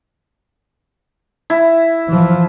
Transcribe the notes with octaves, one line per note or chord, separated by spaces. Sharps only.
E4
E3 F3